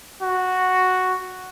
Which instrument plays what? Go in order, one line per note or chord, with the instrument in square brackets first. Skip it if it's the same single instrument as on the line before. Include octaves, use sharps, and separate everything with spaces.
[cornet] F#4